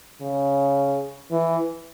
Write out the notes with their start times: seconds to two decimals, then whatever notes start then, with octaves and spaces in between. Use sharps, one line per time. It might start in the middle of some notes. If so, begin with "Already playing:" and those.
0.21 C#3
1.31 E3